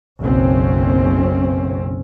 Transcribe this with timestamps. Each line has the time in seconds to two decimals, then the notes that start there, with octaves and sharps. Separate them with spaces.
0.21 F#1 B1 C4 C#4